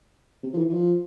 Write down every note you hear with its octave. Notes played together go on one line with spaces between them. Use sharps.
C3
F3
E3
E3
F3